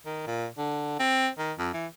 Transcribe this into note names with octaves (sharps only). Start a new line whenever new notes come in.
D#3
A#2
D3
C4
D#3
F2
E3